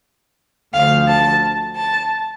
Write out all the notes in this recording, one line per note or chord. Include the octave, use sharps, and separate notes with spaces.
D2 D3 F3 F5
A5
A5